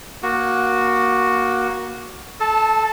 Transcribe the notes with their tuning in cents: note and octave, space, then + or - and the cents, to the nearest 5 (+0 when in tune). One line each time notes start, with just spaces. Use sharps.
A#3 +15 F#4 +0
A4 -20 A5 +5